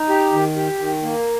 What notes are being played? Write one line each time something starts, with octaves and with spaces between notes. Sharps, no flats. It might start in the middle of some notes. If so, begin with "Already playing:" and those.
Already playing: D#4
G4
D#3
G4
D#3
A#3